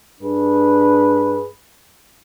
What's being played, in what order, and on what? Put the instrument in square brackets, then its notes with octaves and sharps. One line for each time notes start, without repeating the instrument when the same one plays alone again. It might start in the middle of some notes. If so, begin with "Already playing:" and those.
[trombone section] G2 D4 G#4 B4